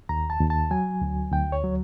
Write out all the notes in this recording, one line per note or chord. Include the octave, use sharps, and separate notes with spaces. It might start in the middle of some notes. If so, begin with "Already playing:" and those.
D#2 A#5
A5
D#2
A5
F#3 G#5
D2
D2 G5
C#5
F#3